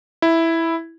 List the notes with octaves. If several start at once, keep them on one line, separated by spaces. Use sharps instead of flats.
E4